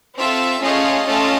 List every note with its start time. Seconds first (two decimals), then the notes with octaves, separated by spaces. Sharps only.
0.18 C4 F4 A4 E5
0.61 A3 C#4 F4 G#4 D#5
1.05 A3 C#4 F4 A4